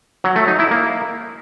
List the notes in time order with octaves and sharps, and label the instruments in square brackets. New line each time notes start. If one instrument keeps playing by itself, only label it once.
[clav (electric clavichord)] F#3
A3
D#4
E4
A#3